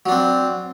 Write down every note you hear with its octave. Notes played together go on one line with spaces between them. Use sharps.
F#3 C4 D4